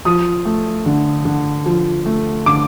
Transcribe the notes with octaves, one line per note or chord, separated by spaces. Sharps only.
F3 D#6
A3
D3
D3
F3
A3
D3 D6